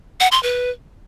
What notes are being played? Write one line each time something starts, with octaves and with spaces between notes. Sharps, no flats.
F#5
C6
B4